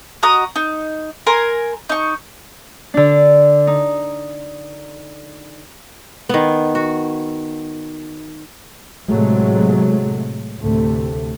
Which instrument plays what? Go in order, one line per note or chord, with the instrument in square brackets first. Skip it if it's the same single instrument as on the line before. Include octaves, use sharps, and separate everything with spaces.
[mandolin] F#4 D#5 A#5 D#6
D#4
A#4 G#5 C6
D#4 C#6
[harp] D3 D4
D#4
[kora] D#3 B3
F#4
[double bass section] A2 C3 F#3 G#3 A3
D2 A2 C3 A3